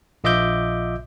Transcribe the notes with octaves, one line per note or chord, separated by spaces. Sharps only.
A#1 F4 D#5 E5 D6 G6